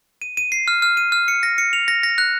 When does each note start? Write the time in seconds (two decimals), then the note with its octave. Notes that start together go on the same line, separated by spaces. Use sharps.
0.22 D#7
0.37 D#7
0.52 C7
0.68 F6
0.82 F6
0.97 D#7
1.12 F6
1.28 C#7
1.43 A#6
1.58 C#7
1.73 F7
1.88 A#6
2.03 A#6
2.18 F#6